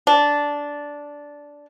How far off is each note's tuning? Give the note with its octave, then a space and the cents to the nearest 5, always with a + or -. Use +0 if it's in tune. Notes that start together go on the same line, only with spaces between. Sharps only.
D4 -10